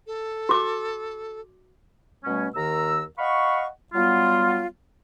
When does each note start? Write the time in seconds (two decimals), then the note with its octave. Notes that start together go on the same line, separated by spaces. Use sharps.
0.07 A4
0.49 F#4 D6
2.24 B2 G3 A3 C#4
2.55 D#2 D#3 A#4 A#5 E6
3.19 D#5 F5 F#5 B5 C#6
3.93 F#3 G3 B3 F4